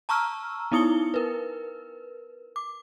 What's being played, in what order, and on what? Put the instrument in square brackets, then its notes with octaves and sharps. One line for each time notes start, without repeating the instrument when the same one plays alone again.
[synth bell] A5 A#5 C#6 E6 F6
B3 D#4 E4 D#6 C#7 G7
A#4 B4
D6